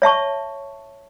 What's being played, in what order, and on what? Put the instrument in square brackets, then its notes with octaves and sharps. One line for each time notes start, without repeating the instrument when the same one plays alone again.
[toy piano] C#5 E5 A5 C#6